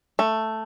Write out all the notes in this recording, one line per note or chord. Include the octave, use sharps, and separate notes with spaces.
A3